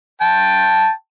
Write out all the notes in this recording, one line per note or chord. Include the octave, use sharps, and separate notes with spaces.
G5 A5